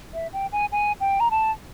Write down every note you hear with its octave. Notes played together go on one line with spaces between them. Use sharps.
E5
G5
G#5
G#5
G5
A#5
A5